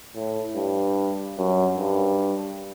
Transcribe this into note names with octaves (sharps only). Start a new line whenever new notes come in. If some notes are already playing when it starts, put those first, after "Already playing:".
A2
G2
F#2
G2